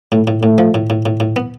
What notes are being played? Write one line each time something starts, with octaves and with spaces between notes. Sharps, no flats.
A2 A3
A2
A2 A3
F3
A2
A2
A2
A2
B3